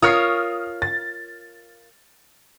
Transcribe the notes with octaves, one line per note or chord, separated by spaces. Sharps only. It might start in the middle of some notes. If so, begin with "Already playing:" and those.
F4 A#4 C#5 D#6 F6 C7
A6